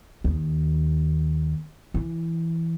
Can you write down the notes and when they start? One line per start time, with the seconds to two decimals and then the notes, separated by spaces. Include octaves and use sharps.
0.24 D#2
1.94 E3